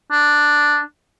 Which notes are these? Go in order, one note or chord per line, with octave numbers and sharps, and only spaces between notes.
D4